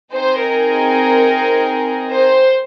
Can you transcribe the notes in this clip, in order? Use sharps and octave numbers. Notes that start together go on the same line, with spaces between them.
C4 D#4 G#4 C5
A#4
C5